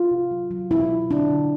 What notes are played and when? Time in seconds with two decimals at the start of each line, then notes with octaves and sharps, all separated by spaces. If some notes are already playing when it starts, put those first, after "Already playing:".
Already playing: F4
0.11 C3
0.31 F#3
0.51 F#3
0.71 B2 E4
0.91 F#3
1.10 D3 D4
1.30 D3